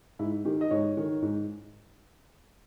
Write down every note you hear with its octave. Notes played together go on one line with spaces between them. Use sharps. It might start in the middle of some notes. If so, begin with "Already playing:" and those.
G#2 E4
D#3 G4
D#5
G#2 C#5
D#3
G#2